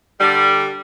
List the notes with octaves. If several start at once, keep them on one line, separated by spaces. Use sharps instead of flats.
D3 G3